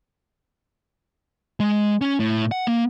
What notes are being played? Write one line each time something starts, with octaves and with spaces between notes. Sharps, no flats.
G#3
C#4
A2
F#5
A#3